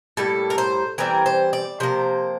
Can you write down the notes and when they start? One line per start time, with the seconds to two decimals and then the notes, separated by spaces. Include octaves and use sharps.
0.17 A2 G3 A#3 A4
0.50 A#4
0.58 C5
0.98 E3 G3 C4 A#4
1.26 C5
1.53 D5
1.80 C3 F3 A#3 C5